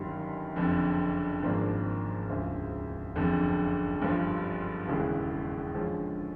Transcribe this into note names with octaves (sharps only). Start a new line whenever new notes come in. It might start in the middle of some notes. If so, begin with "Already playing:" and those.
Already playing: G1 F#2 D#3 G3
F#1 F2 D3
G#1 G#2 F3 A#3 D4
E1 D2 C#3 F3
F#1 F2 D3
G1 G2 D3 F3
E1 D#2 C#3 E3
D3 F3 G#3 C#4